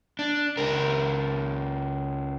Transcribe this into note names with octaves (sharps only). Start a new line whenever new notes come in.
D4
C#2 A#4